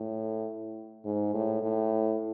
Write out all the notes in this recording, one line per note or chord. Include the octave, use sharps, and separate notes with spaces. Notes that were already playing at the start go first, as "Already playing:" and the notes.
Already playing: A2
G#2
A2
A2